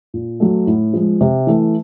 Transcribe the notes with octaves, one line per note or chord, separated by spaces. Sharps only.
A#2
F#3 A3
A2
F3 G#3
C3
E3 A3